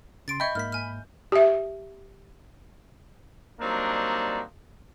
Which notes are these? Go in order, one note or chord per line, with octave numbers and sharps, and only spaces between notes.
C#3 C6 A6 D7
D#5 E5 G5 B5 C#6 G6 G#6
G#2 A#3 F6 B6
G#5 F6
G4 E5
F#3 G3 A#3 C4 D4 D#4